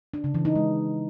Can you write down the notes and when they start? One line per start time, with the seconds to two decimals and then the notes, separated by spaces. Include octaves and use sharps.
0.14 D4
0.24 C#3
0.35 E3
0.45 D#4
0.55 G#3